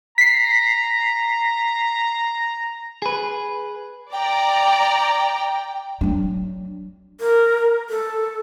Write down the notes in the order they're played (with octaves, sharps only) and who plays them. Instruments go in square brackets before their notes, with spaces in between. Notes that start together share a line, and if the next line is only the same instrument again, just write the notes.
[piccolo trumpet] A#5 [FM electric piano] B6 C7
[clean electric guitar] G#4 B4
[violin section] D5 A#5 [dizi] G5
[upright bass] F#3 D4
[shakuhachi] A#4
A4